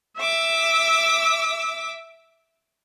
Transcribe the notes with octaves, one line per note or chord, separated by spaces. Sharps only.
E5 D6 E6